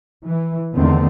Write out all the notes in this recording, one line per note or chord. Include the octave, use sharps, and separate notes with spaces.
E3
E2 D3 D#3 A3 C4